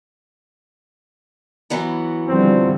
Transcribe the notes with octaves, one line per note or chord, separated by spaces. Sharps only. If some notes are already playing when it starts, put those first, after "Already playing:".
E3 F#3 B3
D3 F3 G3 C4